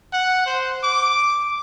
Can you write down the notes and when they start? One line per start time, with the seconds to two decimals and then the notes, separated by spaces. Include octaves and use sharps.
0.13 F#5
0.46 C5
0.83 D6